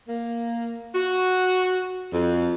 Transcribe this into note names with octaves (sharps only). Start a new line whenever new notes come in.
A#3
F#4
F2